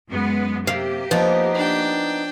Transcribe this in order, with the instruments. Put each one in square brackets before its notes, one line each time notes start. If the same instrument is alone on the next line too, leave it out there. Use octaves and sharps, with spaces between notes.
[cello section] F#2 G#3 B3
[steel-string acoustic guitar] C3 [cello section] A#3 G4 [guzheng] F5
[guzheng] F3 [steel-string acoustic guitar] B3 D#4
[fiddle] D4 G5